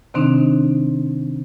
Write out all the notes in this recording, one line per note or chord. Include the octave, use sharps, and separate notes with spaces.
C3 D#3 C4 D4 D#4